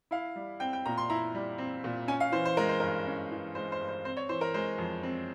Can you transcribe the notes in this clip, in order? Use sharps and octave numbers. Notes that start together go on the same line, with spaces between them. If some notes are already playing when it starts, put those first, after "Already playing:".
E4 F5
G3
C4 G5
G5
A#2 A#5
C6
E4 A#5
G3
C4
A#2
C#4 G#5
F5
E3 C5
C5
G#3 A#4
C5
G2 A#4
C#4
E3
G#3 C5
C5
G2
C5
C4 C5
C#5
E3 C5
A#4
G#3 C5
F2
C4